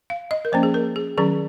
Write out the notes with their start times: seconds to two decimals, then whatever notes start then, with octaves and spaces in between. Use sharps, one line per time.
0.10 F5
0.31 D#5
0.45 A#4
0.52 F3 A#3 C#4 C5
0.63 G#4
0.74 A#4
0.96 G#4
1.17 D#3 F#3 C#4 G#4